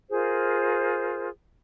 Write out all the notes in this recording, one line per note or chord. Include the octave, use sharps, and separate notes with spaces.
F4 G#4 A#4 C5